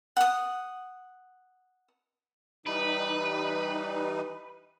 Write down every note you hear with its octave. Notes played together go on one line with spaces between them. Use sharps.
F#5 D#6
E3 G3 D#4 B4